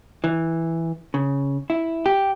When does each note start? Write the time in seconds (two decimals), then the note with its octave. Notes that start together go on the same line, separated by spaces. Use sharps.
0.24 E3
1.14 C#3
1.70 E4
2.06 G4